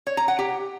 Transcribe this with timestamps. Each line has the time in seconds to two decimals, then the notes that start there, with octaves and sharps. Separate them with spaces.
0.07 C#5
0.17 A#5
0.28 F#5
0.39 G4